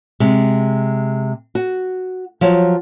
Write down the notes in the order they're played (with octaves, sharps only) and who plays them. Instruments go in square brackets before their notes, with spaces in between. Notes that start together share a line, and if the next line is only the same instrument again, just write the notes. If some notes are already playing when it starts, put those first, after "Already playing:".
[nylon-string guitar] C3 G#3
F#4
F3 F#3 C#5